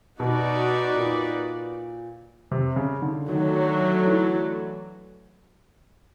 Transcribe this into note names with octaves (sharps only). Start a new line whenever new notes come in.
B2 D#4 F#4 B4 D5
A#2
C3
C#3
D3
D3 D#3 F#3 A3
E3